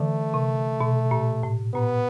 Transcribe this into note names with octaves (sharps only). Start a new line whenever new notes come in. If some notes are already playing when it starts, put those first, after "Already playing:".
Already playing: D3 E3 A3
C3
B2
A#2
A2
A#2 B3